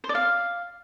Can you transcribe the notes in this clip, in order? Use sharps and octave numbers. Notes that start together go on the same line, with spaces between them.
C5
D5
F5